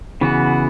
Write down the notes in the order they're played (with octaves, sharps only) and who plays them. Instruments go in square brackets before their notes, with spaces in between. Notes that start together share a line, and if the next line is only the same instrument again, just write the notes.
[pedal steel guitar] C#3 E3 B3 F#4